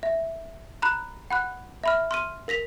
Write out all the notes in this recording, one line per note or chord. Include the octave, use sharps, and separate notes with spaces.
E5
A#5 B5 F#6
F#5 B5 F#6
E5 B5 F6
C6 F6 D#7
A#4 A#6 B6 F7